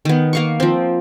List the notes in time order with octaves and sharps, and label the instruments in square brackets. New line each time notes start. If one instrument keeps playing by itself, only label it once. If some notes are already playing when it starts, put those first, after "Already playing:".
[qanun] D#3 B3
A#3 F5 C#6
F3 C4